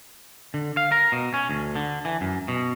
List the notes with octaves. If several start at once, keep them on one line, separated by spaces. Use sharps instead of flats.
D3
F5
A#4
B2
C#4
D2
D3
E3
F#2
B2